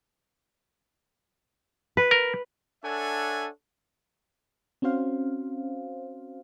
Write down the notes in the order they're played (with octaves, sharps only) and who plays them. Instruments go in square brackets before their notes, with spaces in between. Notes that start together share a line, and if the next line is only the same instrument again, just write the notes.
[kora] B4
[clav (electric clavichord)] A#4
[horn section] D4 A4 C#5 E5 F#5 G#5
[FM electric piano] C4 C#4 F#4 C5 F5